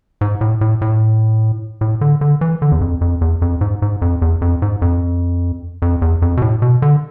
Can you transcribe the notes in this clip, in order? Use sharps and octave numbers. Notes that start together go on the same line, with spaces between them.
G#2
A2
A2
A2
A2
D3
D3
E3
D3
E2
F2
F2
E2
F2
G#2
G#2
F2
E2
F2
G#2
F2
F2
E2
F2
B2
A2
B2
D3